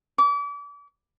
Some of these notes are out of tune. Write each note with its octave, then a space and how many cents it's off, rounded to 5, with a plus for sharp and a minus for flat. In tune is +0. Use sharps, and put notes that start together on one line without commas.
D6 -35